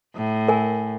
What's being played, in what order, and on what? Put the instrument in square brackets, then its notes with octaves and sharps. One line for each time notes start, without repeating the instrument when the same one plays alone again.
[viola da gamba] A2
[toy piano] A#4 G#5